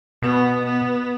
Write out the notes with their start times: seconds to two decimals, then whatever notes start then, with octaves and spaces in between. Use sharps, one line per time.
0.22 B2 B3
0.66 B3